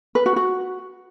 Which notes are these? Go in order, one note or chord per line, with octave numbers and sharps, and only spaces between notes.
B4
F#4
F#4